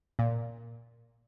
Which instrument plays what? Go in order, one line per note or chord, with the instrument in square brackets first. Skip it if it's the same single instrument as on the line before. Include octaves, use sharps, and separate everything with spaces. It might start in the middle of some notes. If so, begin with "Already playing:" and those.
[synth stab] A#2